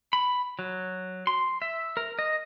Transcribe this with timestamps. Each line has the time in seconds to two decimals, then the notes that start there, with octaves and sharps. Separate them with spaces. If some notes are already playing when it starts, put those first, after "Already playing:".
0.13 B5
0.59 F#3
1.27 C6
1.62 E5
1.97 A#4
2.19 D#5